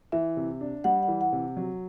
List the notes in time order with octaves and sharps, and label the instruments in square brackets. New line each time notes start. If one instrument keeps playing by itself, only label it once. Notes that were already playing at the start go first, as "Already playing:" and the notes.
[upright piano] E3 [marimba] E5
[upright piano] C3
D4
[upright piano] G3 [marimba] F#5
[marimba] F#5
[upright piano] E3
[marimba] F#5
[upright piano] C3
F#3